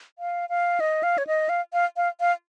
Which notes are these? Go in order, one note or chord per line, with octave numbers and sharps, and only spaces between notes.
F5
F5
D#5
F5
C#5
D#5
F5
F5
F5
F5